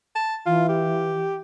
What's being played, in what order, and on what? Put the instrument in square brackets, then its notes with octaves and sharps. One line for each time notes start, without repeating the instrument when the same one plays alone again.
[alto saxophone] A5
[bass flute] E3 [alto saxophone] F4
[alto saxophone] G4